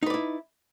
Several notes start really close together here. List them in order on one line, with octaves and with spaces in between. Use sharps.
D#4 B4 D5 E4